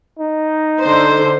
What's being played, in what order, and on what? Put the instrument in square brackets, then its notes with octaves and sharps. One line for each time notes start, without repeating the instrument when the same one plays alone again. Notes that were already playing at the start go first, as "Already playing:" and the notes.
[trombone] D#4
[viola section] D3 C5